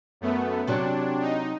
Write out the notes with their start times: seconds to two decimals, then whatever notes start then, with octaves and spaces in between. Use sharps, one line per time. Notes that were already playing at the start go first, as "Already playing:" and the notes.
0.21 F#2 A3 B3
0.67 C3 F#3 D4 F#4
1.21 D#4